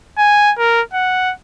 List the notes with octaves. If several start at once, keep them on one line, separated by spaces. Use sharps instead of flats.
G#5
A#4
F#5